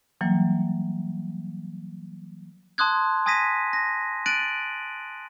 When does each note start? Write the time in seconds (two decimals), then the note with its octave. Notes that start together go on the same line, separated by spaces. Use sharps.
0.21 E3 F#3 G3 A#3
2.78 A5 C6 D#6 F#6 G#6
3.26 G#5 D#6 G#6 A#6 B6 D#7
3.73 A#6
4.26 F#6 A6 D7 D#7 F#7